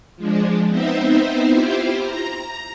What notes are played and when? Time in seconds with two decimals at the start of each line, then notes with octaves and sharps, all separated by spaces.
0.16 F3 G#3 D4
0.68 B3 C4 D#4 C5 E5
1.49 E4 F4 G4 C5
2.02 A#5